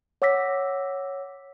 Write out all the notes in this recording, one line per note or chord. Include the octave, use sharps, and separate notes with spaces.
C#5 F#5 D6 E6 A#6 B6